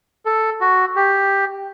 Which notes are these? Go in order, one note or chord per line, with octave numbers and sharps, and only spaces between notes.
A4
F#4
G4